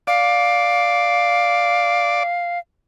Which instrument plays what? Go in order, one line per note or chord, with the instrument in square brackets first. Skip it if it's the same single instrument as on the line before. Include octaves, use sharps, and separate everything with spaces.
[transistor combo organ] D5 [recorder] F5